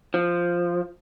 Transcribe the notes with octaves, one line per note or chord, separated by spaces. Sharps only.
F3